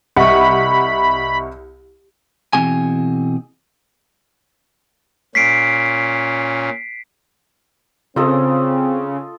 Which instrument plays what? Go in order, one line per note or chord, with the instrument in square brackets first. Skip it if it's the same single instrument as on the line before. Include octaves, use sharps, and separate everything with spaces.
[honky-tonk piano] C2 F#5 [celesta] D#5 E5 C#6 [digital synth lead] B5
[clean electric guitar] B2 E3 C4 G#4 G#5
[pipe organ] A#2 C#4 [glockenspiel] B6 C7 D7
[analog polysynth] C#3 [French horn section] C4 [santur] F4 A4 D#5